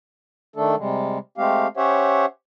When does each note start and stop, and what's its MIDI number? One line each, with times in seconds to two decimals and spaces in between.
0.56 0.75 51
0.56 0.75 57
0.56 0.75 62
0.56 0.75 69
0.78 1.18 48
0.78 1.18 55
0.78 1.18 56
1.38 1.67 56
1.38 1.67 57
1.38 1.67 60
1.38 1.67 67
1.38 1.67 77
1.77 2.25 61
1.77 2.25 67
1.77 2.25 72
1.77 2.25 73
1.77 2.25 76
1.77 2.25 78